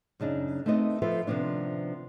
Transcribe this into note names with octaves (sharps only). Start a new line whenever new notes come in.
F#2 C#3 D4 D#4
A3 B3 C4 D#4 D#5
F3 F4 A4 B4 C5 E5
C3 D#3 F3 B3 D4